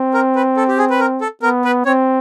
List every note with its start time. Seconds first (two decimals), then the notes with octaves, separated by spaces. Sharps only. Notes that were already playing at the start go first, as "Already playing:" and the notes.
Already playing: C4
0.14 A#4
0.36 B4
0.57 A4
0.68 G4
0.78 G#4
0.90 B4
1.00 A#4
1.21 A4
1.43 B3 A#4
1.65 B4
1.86 C4 C#5